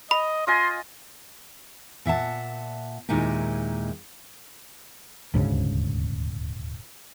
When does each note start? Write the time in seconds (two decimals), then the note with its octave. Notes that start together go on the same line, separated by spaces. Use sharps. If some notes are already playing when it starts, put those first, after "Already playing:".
0.11 D#5 B5
0.47 F4 D#5 G#5 C6
2.06 A#2 E5 F#5 A5
3.09 D#2 A#2 G#3 D#4 E4 G4
5.34 D#1 D2 G#2 C#3